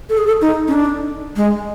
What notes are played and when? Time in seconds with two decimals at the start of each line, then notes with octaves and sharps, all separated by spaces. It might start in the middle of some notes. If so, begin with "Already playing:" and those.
0.09 A4
0.18 G#4
0.27 A4
0.42 D#4
0.68 C#4
0.73 D4
1.36 G#3